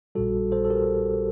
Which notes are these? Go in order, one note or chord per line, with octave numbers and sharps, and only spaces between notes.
A#1 A#2 G3 F#4 A4
A4 C5
A4
G4 A#4